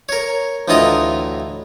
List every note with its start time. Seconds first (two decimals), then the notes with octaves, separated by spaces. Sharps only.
0.09 A#4 C#5
0.68 D2 A2 E3 F4 D#5 A#5